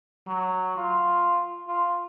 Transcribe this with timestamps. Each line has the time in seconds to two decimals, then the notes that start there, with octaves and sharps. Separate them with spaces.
0.27 F#3
0.77 F4
1.68 F4